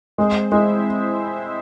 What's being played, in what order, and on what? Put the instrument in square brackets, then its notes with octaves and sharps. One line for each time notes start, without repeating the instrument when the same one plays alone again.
[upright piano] G#3 [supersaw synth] C4 C5
[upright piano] G#3 [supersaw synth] E4 E5